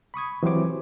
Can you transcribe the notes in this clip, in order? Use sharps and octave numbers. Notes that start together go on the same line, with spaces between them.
B5 C#6 D#6 G#6
E3 F#3 C4 G4 C5 D6